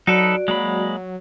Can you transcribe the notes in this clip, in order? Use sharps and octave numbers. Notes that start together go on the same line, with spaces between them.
F#3 D#4 F#4 A4 B4 D5
F#3 G#3 A#3 B5